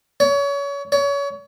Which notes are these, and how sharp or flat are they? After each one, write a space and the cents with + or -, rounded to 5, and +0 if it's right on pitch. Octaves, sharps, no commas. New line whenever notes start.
C#5 +30
C#5 +30